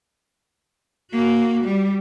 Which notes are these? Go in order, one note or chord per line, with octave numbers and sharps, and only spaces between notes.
A#3 F#4
G3